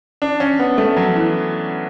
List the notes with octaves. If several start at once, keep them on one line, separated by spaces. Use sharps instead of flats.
D4
C#4
B3
A3
F#3
E3